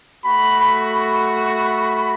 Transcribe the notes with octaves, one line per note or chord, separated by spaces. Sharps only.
A3 F#4 B5
B5
B5